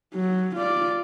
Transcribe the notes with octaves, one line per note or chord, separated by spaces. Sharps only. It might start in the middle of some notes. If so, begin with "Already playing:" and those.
F#3
F4 D5